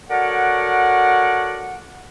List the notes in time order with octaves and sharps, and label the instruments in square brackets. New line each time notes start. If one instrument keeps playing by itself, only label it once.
[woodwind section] F#4 A4 A#4 C#5 D5 F#5